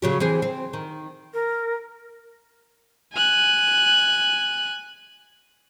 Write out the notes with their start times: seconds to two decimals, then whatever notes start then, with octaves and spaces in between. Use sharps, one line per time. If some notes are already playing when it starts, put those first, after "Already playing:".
0.02 C#3 F#3 G4
0.20 E3 C4 G#4
0.42 C4
0.73 D#3
1.34 A#4
3.14 G#5 F#6